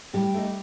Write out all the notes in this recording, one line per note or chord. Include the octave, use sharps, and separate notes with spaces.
A2 G3 G4
A3 D#4